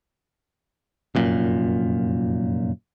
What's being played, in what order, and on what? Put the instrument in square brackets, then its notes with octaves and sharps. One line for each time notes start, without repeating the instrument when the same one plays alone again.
[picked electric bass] F1 F#2 A#2